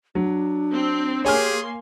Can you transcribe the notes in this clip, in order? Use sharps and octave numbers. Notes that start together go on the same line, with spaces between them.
F#3 D4
C4
A#3 G4 G#4 C#5 G#5 C6 F6